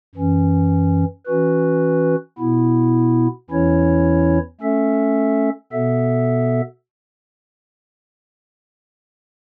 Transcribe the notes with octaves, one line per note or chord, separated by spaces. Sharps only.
F#2 E3 C#4
E3 C#4 F#4 B4
B2 B3 E4
E2 E3 C#4 E4 C#5
A3 C#4 A4 E5
B2 B3 A4 E5